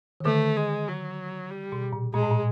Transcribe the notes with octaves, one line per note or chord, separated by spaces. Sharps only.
D#3
D3 A3
G#3
F#3
G3
B2
A#2
A#2 G#3
A2
A#2